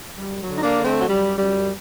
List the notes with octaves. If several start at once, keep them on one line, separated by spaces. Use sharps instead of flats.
F#2 G3
F#3
D3
D#4
A#3 D4
D3
A3 C4
F#3
F#2 G3
F#2 G3